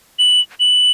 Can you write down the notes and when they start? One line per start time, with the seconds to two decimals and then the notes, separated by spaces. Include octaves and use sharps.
0.19 F#7
0.60 F#7